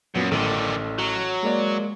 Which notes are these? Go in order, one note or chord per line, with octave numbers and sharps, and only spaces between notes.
F#2 A#2 F#3 B3
A1 D3 D#3 A4 E6
F#3
G#3 A#3 D5